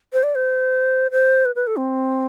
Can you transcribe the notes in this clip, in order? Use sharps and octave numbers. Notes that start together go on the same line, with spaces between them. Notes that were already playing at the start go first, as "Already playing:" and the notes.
C5
D5
C5
C5
B4
B4
A4
C4